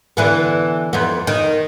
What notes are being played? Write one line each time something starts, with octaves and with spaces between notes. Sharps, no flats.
D3 E3 B3
F2 B3
D#3